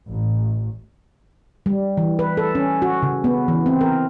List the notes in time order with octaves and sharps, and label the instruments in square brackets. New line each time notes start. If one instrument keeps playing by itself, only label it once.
[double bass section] A1
[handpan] G3
E3
B4
A4
C#4
F#4
C#3
B3
E3
C4
A#4